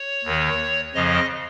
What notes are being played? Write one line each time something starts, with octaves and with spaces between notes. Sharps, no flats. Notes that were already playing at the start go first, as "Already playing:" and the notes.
Already playing: C#5
D#2 D#3
F2 C#3 F3 D#5